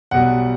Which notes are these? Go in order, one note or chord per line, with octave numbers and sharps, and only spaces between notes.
B1 B2 G3 F#5